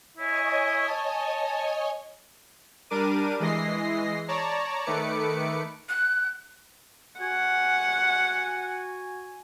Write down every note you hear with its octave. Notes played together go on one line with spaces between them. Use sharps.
E4 C#5 D#5 G#5
A5
G3 D4 A#4 D6 D#7
E3 G#3 D#5 A#6 C7
C#5 D5 A5 A#5
D#3 A3 B4 D6 C#7
F#6
F#4 F#5 G#5